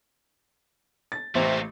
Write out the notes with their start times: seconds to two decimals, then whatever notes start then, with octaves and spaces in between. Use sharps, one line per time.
1.12 A6
1.35 A1 C3 A3 A#3